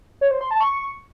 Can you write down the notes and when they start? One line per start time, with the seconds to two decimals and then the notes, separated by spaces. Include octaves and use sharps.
0.21 C#5
0.31 C5
0.41 C6
0.51 A5
0.61 C#6